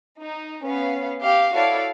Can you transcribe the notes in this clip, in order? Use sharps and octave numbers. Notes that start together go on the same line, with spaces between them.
D#4
B3 C#4 F5
G4 F5
E4 F#4 A4 C#5 D5 F5